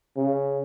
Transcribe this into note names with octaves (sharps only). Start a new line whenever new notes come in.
C#3